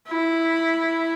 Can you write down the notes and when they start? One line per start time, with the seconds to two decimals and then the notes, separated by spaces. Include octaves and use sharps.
0.08 E4